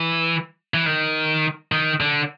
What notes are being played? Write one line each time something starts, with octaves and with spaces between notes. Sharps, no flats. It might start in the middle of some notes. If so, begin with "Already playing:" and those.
Already playing: E3
E3
D#3
D#3
D3